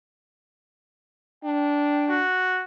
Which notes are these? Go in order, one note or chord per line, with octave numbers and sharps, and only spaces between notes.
D4 G5
F#4